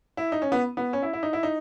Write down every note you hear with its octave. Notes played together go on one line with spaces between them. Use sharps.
E4
D#4
C#4
B3
B3
C#4
E4
E4
D#4
E4
D#4